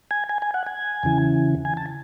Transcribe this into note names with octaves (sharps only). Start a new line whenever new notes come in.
G#5
G#5
G#5
F#5
G#5
E2 C#3 E3
G#5
A5